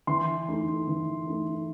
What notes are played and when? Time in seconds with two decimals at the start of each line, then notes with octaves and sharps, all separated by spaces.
0.07 E3 C6
0.48 A3 D#4
0.87 E3
1.27 A3 D#4